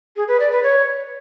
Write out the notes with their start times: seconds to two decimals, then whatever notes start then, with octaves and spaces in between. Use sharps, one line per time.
0.16 G#4
0.28 B4
0.40 D5
0.52 B4
0.63 C#5